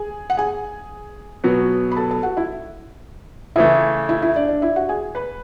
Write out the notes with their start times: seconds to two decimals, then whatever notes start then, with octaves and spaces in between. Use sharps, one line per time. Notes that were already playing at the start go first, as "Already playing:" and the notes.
Already playing: G#4 G#5
0.30 F#5
0.37 G#4 G#5
1.44 B2 F#3 B3
1.91 B5
1.96 A4 A5
2.11 A4 A5
2.23 F#4 F#5
2.37 E4 E5
3.56 C#3 E3 A3 E4 E5
4.09 E4 E5
4.22 E4 E5
4.35 D4 D5
4.48 D4 D5
4.62 E4 E5
4.76 F#4 F#5
4.89 G#4 G#5
5.15 B4 B5